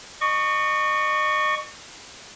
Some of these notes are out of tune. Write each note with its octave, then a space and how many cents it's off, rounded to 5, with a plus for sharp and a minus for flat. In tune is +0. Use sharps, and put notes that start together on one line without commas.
D#5 -40 C#6 +5